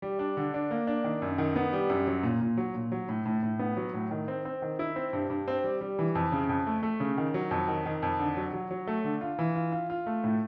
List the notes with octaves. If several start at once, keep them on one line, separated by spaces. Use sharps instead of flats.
G3
D4
D3
D4
A#3
D4
D#3
F#2
D#3
B3
G3
F#2
F#3
A#2
A#2
F#3
A#2
F#3
A2
A2
A2
B3
F#3
A2
D#3
C4
C4
D#3
E4
C4
G2
G2
C4
G3
G3
E3
F2
C#3
F2
A3
A3
C#3
D#3
F#3
F2
D#3
D#3
F2
D3
F#3
F#3
F#3
A3
D3
F4
E3
F4
F4
F4
A3
A2